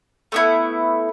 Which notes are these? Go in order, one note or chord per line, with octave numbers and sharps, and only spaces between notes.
A3 B3 E4